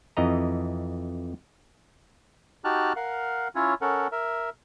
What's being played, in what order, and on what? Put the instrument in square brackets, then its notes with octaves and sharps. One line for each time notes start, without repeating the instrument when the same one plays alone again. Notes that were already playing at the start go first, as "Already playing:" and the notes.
[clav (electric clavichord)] F2 E3 D#5 A#5
[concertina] D#4 F#4 G4 A5 F6 F#6
A#4 F5 F#5
C#4 E4 F4 C#5
C#4 A4 A#4 F#5
A#4 E5